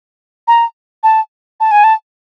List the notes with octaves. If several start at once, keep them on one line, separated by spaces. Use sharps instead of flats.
A#5
A5
A5
G#5
A5